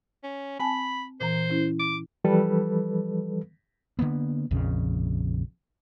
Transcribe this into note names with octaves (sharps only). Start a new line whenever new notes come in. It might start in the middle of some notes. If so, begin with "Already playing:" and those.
C#4
C4 G#5 A5 B5
A#2 E3 C5 A#5
C#4 E4
D6
E3 F3 G3 A4 B4
D3 E3 A#3 B3
A#1 F2 C#3